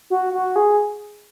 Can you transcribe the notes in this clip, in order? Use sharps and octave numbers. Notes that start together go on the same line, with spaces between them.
F#4
F#4
G#4